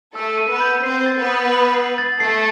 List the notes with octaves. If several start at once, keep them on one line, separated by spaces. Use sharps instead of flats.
A3 A4 E6
D#7
B3 B4
G6
C4 C5 C7
A6
B3 B4
D#6
F#7
C7
A6
A3 A4 C7